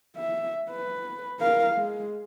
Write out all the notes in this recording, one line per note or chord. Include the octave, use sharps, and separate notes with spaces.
E5
B4
A#4 F5
G#3